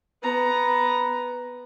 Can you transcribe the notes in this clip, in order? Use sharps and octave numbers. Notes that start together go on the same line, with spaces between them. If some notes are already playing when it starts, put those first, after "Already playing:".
B3 A#5